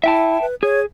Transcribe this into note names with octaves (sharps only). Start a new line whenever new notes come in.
E4 E5 G5 A5
B4
G#4 C#5